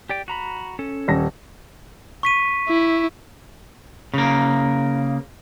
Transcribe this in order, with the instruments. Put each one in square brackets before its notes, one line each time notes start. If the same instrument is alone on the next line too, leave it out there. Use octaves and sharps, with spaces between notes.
[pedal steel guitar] G4 D5 G5
F#4 A#5 B5
C#4 A4
[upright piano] D#1 A#6
[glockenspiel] C#6 B6 D#7
[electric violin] E4
[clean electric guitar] C#3 A#3